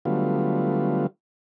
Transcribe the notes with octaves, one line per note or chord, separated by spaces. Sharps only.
D3 F#3 G3 A3 B3 F4